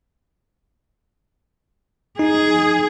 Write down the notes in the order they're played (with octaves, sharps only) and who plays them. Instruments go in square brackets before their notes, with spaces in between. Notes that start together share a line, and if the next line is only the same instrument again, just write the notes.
[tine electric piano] D#4 [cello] G#4